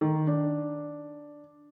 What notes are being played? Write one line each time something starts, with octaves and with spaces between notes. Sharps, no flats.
D#3
D4